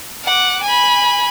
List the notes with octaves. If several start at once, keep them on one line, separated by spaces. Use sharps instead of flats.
F#5 D6
G#5 B5